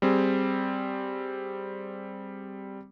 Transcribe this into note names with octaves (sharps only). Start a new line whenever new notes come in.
G3 C4 G#4